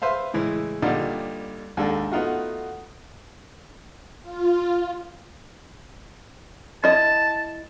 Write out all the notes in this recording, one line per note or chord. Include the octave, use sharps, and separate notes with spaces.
B4 C5 E5 F5
A2 C#3 E3 G#3
G2 A#2 D3 G3 D#4
D#2 G#2 D4 A4
A3 B3 D#4 F4 F#4
F4
E4 D#5 A5